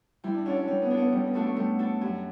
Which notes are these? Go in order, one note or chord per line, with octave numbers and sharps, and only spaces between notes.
G3 E4
D4
C#4 D4 F#4 A4
C#4
G3 C#4
B3
D4 F#4 A4
B3
G3 C#4
B3
A3 D4 F#4 A4
A3
G3 A3
D4 F#4 A4
F#2 G3